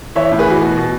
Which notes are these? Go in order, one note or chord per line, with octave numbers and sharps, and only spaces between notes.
E3 C#5 E5
A2
G#4 B4
E3 F#4
B2 F#4
B2